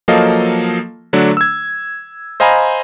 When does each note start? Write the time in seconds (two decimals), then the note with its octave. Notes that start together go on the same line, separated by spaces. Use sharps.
0.08 F3 F#3 A#3 A4 D#5 F5
1.13 D3 F#3 A3 D4
1.37 E6 G#6
2.40 C5 D#5 F5 G#5 A#5 B5